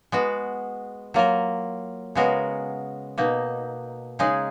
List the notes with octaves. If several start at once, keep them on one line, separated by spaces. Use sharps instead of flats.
G#3 B3 F#4
F#3 A#3 F4 A#4
C#3 G#3 B3 F#4 A#4
B2 A#3 D#4
C#3 G#3 D#4 G#4